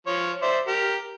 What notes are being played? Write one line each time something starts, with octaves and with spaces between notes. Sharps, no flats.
F3 C#5
C5 D5 E5
G4 A#4